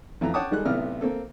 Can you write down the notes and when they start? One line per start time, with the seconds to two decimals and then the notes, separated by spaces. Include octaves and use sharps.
0.21 A1 F2 E3 A#5
0.34 C#5 F#5 G5 A5 D6 D#6
0.51 D#3 G3 G#3 A4 F#6
0.65 B1 A2 C3 B3 D5 F6
1.01 A#3 C4 A4